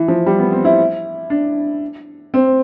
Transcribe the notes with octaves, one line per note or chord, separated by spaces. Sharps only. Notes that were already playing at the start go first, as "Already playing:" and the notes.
Already playing: E3
F3
G3
B3
C4
E4
D4
C4